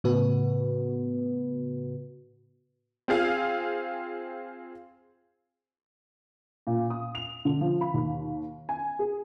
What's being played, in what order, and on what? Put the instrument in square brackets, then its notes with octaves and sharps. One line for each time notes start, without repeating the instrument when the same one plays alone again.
[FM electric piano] A2 C#3 B3 F#4 B4
[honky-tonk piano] C4 F4 G#4 F5
A#2
D#6
F7
D3
F3
B5
D#2
G#5
G#4